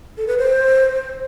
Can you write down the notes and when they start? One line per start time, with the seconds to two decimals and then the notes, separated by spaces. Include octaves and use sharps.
0.18 A4
0.27 B4
0.38 C5